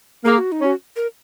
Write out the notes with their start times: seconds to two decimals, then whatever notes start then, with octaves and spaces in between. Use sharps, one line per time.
0.25 A#3 G#4
0.38 F#4
0.52 D#4
0.61 C#4 F#4
0.96 A#4